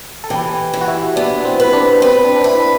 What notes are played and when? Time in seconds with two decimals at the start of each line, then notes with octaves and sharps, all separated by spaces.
0.24 A4
0.30 E3 G4
0.73 E3
0.81 F#4
0.88 E4
1.16 B3 D4
1.45 C4
1.60 B4
1.73 D4
2.02 C4 B4
2.24 D4
2.36 D4
2.44 E4 B4